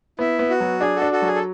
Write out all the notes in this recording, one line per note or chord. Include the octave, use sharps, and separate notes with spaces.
B3 E4
B3
F#4
F#3
D4 G#4
F#4 A4
D4
F#4 A4
F#3 G#4
A4